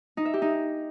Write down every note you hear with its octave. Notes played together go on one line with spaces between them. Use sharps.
D#4
E5
G4
D#4